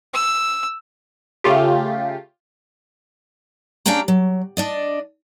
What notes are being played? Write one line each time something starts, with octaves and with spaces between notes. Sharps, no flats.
E6
C#3 A3 F4 G4
C#4 D4 G4 F5 G5 A#5
F#3
D4 D5 D#5